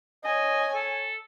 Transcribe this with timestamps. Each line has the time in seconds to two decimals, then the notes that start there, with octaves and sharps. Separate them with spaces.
0.24 C#5 D#5 G#5
0.74 A4